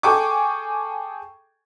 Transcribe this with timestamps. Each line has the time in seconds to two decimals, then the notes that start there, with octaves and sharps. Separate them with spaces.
0.03 G#4 A4 G5 G#5 C#6 D6